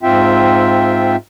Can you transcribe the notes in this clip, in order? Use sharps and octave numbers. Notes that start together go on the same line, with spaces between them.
G#2 C4 F4 E5 G5